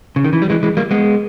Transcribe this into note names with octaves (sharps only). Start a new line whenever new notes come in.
C#3
D#3
E3
G3
E3 G#3
E3 G#3
G3 A#3
G#3 B3